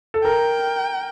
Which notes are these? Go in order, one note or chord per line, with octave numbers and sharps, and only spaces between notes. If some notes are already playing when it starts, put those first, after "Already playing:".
A4
A#4 G5